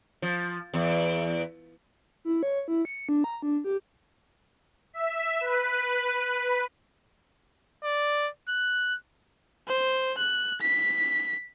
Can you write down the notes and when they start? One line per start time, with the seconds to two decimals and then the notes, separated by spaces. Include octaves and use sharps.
0.22 F3
0.74 E2
2.25 E4
2.43 C#5
2.68 E4
2.85 C#7
3.09 D4
3.24 A#5
3.42 D4
3.64 G4
4.93 E5
5.41 B4
7.84 D5
8.49 F#6
9.68 C5
10.18 F#6
10.61 B6